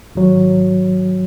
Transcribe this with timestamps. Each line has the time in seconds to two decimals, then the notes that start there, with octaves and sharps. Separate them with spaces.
0.15 G#1 F#3